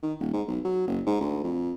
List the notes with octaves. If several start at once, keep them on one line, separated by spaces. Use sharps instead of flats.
D#3
D#1
G#2
B1
F#3
F#1
G#2
D2
F2